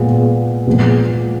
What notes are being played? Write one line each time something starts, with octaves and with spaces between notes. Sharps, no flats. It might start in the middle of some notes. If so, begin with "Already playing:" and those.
Already playing: A#2 G#3 B3
A#2 F3 G#3 B3